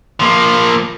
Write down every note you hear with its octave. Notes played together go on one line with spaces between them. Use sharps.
F3 A#3